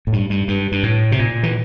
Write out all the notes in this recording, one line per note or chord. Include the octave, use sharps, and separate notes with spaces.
A2
G2
G2
G2
G2
A2
C3
A#2
E3